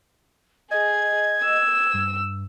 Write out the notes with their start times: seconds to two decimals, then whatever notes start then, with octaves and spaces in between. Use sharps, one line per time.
0.71 G#4 D#5 G#6
1.44 E6
1.94 G2